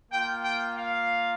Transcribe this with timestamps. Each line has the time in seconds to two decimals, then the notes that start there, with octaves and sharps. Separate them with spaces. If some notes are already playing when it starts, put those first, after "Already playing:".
0.11 A#3 F4 G5
0.43 G5
0.75 F5